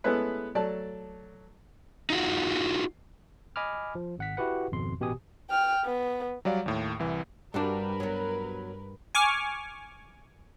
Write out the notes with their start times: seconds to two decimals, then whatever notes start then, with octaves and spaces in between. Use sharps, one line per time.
0.04 G#3 A3 B3 C#4 E4 B4
0.55 F#3 A3 D5 A5
2.10 D#4 F4 F#4
3.56 D#5 G#5 B5 D6 F6
3.95 F3
4.18 G#1 F#5 B6
4.37 E4 F#4 G4 B4 F#5
4.72 G#1 F2 B2 C6
5.00 A1 B2 G4 G#5 D#6
5.50 G5 F6
5.85 B3
6.45 F#3 G3 D5 F5
6.66 D#2 A2
6.99 C2 E3
7.54 G2 G3 C4 D4 F#4 A#4 B4
8.00 F#3 B3
9.15 G#5 C#6 D6 F6